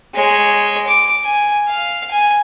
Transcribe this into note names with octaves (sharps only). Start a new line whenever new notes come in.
G#3 C#5
D6
G#5
F5
G#5